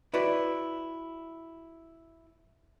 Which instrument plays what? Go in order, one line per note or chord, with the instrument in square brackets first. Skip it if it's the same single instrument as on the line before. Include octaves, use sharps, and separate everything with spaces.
[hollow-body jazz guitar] E4 F#4 B4 D5 E5